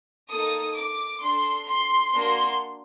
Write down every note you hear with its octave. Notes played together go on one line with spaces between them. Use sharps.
A#3 D#4 A4 D#6
D6
D4 A4 C6
C6
A#3 D4 F#4